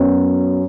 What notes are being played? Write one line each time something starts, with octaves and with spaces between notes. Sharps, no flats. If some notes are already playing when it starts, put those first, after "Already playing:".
Already playing: F#2 F#3 B3